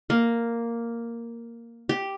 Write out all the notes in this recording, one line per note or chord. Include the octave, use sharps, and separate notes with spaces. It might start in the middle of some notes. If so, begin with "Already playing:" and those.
A#3
G4